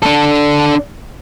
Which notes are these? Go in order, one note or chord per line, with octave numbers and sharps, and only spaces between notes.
D4 A4